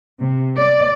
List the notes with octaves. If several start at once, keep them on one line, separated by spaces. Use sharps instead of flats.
C3
D5